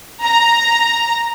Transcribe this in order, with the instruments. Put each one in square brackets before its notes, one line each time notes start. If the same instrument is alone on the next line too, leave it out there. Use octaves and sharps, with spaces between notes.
[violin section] A#5